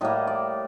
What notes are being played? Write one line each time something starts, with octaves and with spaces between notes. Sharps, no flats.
A2 G3 A#3 D#5
D5